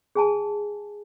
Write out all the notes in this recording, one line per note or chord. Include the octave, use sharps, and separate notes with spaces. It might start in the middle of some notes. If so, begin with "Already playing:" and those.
G#4 G#5 A5